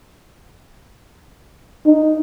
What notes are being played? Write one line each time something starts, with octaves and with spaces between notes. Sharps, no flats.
D#4